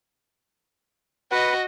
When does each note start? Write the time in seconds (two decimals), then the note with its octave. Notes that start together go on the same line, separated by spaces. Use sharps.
1.32 F#4 B4 D#5 F#5